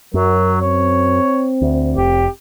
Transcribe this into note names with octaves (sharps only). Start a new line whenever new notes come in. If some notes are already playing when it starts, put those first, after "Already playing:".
F#2 F#3 A#4
C4 C#5
D2
F1 G4